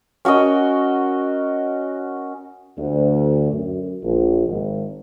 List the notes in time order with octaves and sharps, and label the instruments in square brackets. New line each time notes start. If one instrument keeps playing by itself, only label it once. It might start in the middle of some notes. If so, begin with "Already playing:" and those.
[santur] C#4 F#4 A#4 D#5
[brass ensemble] D2
F#2
A#1
G#1